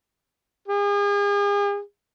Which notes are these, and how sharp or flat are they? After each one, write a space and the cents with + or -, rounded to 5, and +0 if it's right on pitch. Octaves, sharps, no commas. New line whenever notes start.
G#4 -40